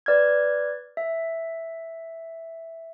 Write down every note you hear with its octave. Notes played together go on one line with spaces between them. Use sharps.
B4 D5 F6 G#6
E5